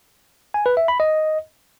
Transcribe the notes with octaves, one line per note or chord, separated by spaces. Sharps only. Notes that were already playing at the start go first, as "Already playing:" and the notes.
G#5
B4
E5
B5
D#5